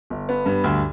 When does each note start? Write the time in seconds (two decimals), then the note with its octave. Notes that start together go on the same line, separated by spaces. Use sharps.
0.10 G1
0.29 B3
0.46 G2
0.64 D2